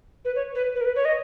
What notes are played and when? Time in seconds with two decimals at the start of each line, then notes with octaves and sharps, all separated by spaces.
0.25 B4
0.35 C#5
0.55 B4
0.75 B4
0.81 A#4
0.85 B4
0.96 C#5
1.05 D#5